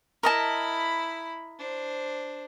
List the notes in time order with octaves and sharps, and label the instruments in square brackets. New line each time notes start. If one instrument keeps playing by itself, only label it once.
[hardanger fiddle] E4 B5 [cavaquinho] A#4 D#5 A5
[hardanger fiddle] D4 C5